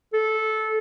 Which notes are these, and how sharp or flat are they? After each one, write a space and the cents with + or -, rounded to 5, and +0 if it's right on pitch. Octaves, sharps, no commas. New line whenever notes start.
A4 -15